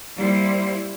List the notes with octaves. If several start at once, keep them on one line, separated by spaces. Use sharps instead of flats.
G3 A#3 E4 C5